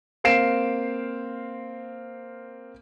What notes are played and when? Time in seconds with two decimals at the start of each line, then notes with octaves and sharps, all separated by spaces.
0.24 A#3 C4 F5 C7 D7 E7